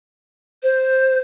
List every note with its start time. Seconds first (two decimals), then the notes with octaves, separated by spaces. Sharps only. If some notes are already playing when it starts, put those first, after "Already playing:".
0.63 C5